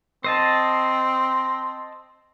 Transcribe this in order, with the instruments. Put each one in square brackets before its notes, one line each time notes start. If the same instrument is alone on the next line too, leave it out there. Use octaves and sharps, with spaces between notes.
[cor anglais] C4 [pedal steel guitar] C5 D#5 A5